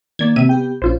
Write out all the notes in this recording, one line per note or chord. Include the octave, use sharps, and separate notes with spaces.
D#3 A#3 D5 G#6
C3 E5 D#7
B3 G4 G5
A#1 C#4 F4 C5